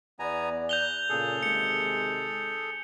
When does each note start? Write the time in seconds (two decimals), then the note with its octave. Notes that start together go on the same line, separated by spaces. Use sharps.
0.19 E2 B3 D5 G#5 A#5
0.69 F#6 G6 F7 G7
1.09 A#2 C#3 G#4 A4
1.43 C3 D#3 G#3 C#7